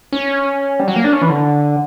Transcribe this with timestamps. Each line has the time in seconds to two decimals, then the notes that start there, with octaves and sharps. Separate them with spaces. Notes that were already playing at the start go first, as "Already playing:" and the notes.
0.13 C#4
0.80 G3
0.88 F#3
0.96 A#3
1.04 D4
1.13 C#4
1.22 E3
1.30 D3